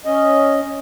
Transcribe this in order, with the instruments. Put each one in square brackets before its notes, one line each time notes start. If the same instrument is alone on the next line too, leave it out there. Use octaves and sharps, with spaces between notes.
[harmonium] C#4 D#5